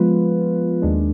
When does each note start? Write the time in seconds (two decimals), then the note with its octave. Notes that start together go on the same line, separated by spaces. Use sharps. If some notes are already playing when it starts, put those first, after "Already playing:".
Already playing: F3 G#3 B3 F4 B4
0.82 D#2 D#3 G#3 D4